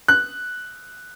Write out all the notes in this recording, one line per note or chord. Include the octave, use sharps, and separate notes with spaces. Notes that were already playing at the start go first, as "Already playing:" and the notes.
F#6